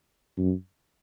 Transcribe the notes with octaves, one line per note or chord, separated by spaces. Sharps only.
F#2